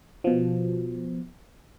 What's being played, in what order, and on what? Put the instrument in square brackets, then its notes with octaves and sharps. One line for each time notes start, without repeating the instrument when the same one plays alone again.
[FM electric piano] B2 F3